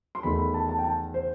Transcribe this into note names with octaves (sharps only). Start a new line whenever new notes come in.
C6
E2 D#3 A3 B5
B5
A5
A5
G5
A5
C5